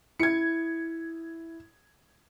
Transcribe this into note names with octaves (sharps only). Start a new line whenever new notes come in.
E4 G#6 C#7